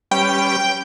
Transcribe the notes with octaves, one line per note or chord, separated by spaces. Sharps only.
G3 C#4 B4 G5